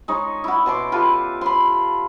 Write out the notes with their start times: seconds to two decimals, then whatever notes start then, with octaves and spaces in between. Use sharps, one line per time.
0.08 G#3 D#4 C#5
0.44 E4 F#4
0.66 B2 C6 D6
0.92 F4 G4 A4 B4
1.41 B5 C6